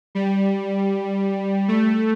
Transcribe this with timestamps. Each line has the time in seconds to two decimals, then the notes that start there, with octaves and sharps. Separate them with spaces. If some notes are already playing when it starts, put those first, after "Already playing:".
0.15 G3
1.68 A3